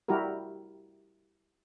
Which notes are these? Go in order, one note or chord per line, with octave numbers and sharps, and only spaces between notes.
G3 E4 F#4 G4 A#4